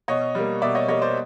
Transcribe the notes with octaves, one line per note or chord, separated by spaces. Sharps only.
B2 C#5 D#5
G3 A#3
B2 D5 E5
C#5 D#5
G3 A#3 C#5 D#5
C5 D5